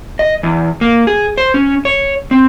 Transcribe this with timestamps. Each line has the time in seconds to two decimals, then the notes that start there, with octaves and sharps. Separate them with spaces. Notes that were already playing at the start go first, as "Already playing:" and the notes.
0.19 D#5
0.43 E2
0.81 A#3
1.07 G#4
1.38 C5
1.54 C#4
1.85 C#5
2.31 C4